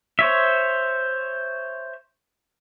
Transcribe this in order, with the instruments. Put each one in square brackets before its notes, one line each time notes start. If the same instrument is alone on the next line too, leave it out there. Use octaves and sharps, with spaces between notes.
[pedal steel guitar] C5 C#5 E5